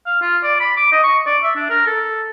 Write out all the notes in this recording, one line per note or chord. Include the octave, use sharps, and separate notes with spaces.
F5
F4
D5
B5
D6
D#5
C#6
D5
E5
D4
A#4
A4